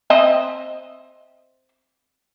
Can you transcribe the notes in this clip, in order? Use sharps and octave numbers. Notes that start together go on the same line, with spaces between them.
C4 D#5 E5